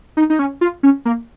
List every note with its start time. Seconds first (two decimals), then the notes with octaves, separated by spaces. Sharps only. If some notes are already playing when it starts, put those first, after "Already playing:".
0.17 D#4
0.30 D#4
0.39 C#4
0.61 F4
0.83 C#4
1.05 A#3